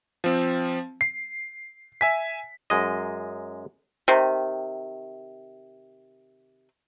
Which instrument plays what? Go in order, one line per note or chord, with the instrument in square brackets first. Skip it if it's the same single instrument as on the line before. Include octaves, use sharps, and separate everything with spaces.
[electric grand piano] F3 C4
C7
E5 G#5 B6
[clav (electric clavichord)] F#2 G#3 D#5
[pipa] C3 D#3